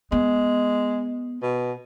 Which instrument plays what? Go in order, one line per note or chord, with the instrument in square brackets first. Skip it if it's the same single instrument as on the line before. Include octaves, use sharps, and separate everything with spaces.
[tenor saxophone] G#3 [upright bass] B3
[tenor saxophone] B2